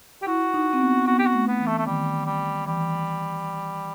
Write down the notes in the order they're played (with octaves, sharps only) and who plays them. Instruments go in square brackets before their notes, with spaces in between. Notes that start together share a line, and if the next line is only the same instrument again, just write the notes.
[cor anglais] G4
[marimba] E4 [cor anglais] F#4
[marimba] E4
D#4
C4
B3
[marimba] B3 [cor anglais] F#4
[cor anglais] G4
F#4
[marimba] A3
[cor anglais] B3
[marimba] E3
[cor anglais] A3
A3
[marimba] D#3 [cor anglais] G3
[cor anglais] G3
[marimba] E3 [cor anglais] G3